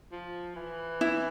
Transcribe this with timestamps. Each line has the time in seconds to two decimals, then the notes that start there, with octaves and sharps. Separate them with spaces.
0.12 F3
0.56 E3
1.01 E4